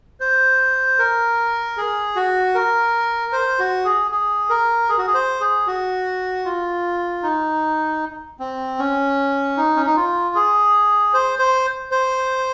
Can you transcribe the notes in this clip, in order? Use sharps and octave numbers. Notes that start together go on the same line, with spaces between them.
C5
A#4
G#4
F#4
A#4
C5
F#4
G#4
G#4
A#4
G#4
F#4
G#4
C5
G#4
F#4
F4
D#4
C4
C#4
D#4
C#4
D#4
F4
G#4
C5
C5
C5